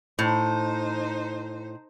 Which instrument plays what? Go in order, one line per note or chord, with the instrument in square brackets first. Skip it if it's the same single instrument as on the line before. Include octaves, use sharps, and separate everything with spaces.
[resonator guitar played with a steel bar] A2 [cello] D#4 C5